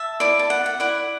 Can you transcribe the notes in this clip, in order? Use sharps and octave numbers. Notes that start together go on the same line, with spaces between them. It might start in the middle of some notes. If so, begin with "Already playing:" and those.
Already playing: E5 A5
E4 D5
A5
F#5
F#5
E4 D5 F#5